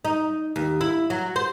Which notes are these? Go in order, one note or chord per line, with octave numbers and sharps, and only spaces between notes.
D#4
D#2
E4
F#3
C5